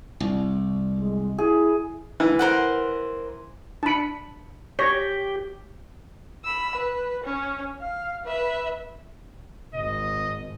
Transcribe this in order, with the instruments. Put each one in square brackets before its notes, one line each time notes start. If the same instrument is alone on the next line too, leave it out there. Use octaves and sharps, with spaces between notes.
[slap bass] C2
[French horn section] G#3
[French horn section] E4 [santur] G#4
[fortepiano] E3
[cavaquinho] A#4 C5 F#5
[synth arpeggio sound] D4 C#7 [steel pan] A5 B5
[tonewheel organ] G4 [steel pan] C#5 [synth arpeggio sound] A#6
[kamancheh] B5 E6
B4
C#4
F5
B4 E5
[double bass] G#1 [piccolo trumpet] D#5